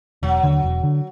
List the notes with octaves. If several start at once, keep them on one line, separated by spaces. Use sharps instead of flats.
E1 F#3
D#2 D3
E1
D3